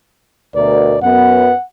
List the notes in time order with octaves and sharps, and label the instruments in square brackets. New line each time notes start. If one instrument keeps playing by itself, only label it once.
[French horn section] D2 B2 A#4 [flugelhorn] D5
[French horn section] F#2 B3 [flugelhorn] F#5